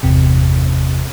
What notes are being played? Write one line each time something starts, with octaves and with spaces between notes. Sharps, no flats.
G1 E2 C3